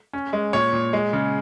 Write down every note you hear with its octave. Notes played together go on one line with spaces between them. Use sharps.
C#4
G#3
A#2 C#5
A#2
G#3
C#3